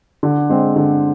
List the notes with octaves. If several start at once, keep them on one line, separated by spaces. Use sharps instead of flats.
D3
G#3 C4
D3